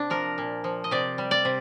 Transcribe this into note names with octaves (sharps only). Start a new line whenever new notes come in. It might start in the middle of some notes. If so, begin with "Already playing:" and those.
Already playing: C3 D4
F3 A#4
A#2
F3
D#5
C3 D5
G3
D5
C3